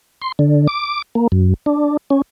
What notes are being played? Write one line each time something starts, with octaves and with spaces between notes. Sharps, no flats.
C6
D3
D6
A#3
F#2
D4
C#4